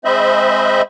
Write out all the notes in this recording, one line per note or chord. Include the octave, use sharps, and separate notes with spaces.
G#3 C4 C5 D#5 E5 B5